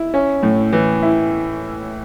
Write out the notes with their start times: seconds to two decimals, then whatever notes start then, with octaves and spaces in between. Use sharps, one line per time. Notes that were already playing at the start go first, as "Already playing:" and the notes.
Already playing: E4
0.14 C#4
0.43 A2
0.73 E3
1.02 E4